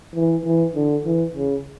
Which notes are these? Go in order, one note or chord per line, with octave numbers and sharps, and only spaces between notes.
E3
E3
D3
E3
C#3